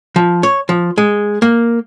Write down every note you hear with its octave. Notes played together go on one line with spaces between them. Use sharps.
F3
C#5
F3
G#3
A#3